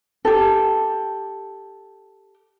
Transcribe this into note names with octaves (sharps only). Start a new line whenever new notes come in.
G4 A4